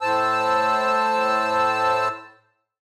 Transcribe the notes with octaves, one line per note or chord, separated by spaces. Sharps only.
A2 C5 A5 E6